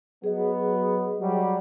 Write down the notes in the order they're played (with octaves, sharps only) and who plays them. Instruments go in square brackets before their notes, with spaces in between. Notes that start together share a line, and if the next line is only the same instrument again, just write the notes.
[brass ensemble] F#3 B3 [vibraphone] G#4 D#5
[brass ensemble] F#3 G3